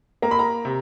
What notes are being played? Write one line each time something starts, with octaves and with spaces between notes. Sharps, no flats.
A#3 A#5
B5
A#5
C3